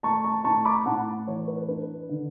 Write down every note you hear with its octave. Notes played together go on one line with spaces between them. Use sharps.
A3 A5 C#6
A5 C#6
A2 A5 C#6
B5 D6
A2 F#5 A5
E3 C#5
B4
D4 B4
D3